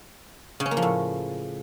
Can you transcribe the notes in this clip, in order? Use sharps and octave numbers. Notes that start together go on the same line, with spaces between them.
C#3
C#4
A#3
F3
A2